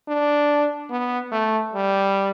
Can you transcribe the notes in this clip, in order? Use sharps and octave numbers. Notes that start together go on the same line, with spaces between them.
D4
B3
A3
G3